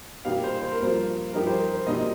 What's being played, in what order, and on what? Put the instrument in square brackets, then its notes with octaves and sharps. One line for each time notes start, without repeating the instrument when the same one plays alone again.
[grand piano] A#2 G3 A#3 D#4 G4 [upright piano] F5
[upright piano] C5
C5
A#4
[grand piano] G2 F3 A#3 F4 [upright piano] C5
[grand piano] G2 F3 D#4 G4 [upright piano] A#4
[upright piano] C5
A#4
C5
[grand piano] A#2 G3 A#3 D#4 [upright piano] D#5